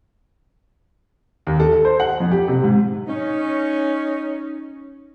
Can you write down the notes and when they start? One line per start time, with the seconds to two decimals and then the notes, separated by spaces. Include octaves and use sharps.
1.47 D#2
1.60 A4
1.72 A4
1.85 C5
2.00 F#5
2.20 F2
2.31 G4
2.48 C3
2.64 G#2
3.08 C#4 D#4